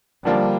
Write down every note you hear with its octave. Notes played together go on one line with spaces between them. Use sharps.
D3 F3 G3 A#3 D4 F4